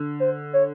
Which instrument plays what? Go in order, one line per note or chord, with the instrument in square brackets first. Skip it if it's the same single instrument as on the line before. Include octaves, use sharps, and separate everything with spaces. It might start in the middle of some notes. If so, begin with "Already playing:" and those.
Already playing: [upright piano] D3
[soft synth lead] C5
C#5